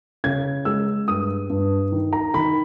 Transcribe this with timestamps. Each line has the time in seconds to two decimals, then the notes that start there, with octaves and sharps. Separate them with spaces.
0.24 C#3 G#6
0.65 G#3 E6
1.08 G2 D#6
1.50 G2
1.92 D#3
2.13 A#5
2.34 D#3 B5